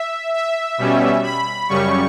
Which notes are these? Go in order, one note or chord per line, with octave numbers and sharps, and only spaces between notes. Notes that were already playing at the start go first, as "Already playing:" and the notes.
Already playing: E5
E5
B2 G3 C#4
B5
F#2 C#3 G3 C#4 C#6